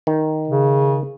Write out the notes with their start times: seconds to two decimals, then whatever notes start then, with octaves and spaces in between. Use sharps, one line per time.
0.07 D#3
0.48 C#3